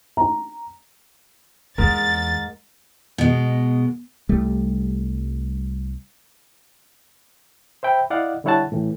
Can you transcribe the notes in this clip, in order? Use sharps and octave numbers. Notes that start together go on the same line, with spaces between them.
A#5
E2 G#2 A#4 A6
B2 G#3
C2 G3 A3
C5 E5 G5 B5
E4 D5 D#5 F5 F#5
D3 G3 E4 C#5 F#5 A5
A2 E3